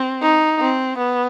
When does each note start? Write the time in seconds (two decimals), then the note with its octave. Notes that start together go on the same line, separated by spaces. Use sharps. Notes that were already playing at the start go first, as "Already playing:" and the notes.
Already playing: C4
0.22 D#4
0.60 C4
0.98 B3